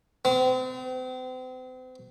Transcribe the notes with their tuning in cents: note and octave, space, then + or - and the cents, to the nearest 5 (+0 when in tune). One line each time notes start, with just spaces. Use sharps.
C4 -40